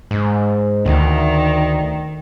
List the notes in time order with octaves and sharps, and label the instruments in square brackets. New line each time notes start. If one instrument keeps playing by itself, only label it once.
[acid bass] G#2
[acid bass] D2 [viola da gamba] D#3